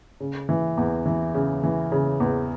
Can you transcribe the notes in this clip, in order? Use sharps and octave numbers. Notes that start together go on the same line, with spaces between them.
C#3
E3
E2
E3
C#3
E3
C#3
E2